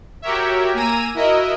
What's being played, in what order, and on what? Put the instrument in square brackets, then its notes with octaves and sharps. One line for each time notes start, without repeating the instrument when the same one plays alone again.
[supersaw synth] F#4 G4 A#4 C#5 E5
A#3 G#5 A#5 E6 D#7
E4 F#4 A#4 D#5 E5